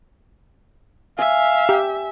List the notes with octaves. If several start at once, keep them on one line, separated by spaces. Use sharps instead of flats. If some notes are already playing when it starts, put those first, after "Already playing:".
E5 F5 G#5
G4